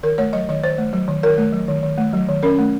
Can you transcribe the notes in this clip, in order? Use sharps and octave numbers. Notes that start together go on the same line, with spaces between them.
D#3 A#4
A3 C#5
F#3 D#5
D#3 D#5
D#3 C5
A3
F#3
D#3
D#3 A#4
A3
F#3
D#3
D#3
A3
F#3
D#3
C#4 A#4
A3